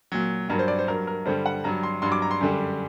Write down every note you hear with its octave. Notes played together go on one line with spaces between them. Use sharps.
A#2 F#3
G2 F#3 A#4
C5
D5
C5
G2 F#3 A#4
A#4
G2 D3 G3 C5
F#5
G2 F#3 A#5
C6
G2 F#3 C6
D6
A#5
C6
F#2 D3 G3